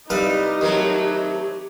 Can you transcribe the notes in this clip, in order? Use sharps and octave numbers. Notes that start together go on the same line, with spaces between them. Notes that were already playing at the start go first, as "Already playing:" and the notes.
C2 G3 D#4 G4 B4 F5
A2 D#3 F#3 C4